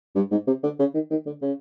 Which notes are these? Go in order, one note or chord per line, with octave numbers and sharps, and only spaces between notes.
G2
G#2
C3
D3
C#3
D#3
D#3
D3
C#3